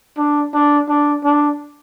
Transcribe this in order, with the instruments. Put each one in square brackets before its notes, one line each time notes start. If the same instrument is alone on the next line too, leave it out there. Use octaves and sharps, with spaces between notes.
[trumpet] D4
D4
D4
D4